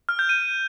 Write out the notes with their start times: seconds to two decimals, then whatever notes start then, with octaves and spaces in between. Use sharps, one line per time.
0.09 F6
0.19 G6
0.29 D#7